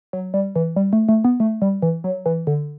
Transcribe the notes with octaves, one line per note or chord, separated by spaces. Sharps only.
F#3
G3
E3
G3
A3
A3
B3
A3
G3
E3
F#3
E3
D3